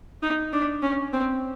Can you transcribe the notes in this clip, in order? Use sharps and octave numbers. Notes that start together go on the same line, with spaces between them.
D#4
D4
C#4
C4